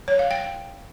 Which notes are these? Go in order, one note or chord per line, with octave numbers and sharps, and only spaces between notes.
C#5
F5
G5